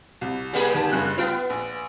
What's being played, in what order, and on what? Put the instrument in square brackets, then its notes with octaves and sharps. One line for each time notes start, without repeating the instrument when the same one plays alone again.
[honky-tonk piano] C2
[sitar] G3 A#3 G#4
[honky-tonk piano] D#3 A5
F#1 G2 F#6
[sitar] B3 [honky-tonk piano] F4 G5
[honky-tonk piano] A#1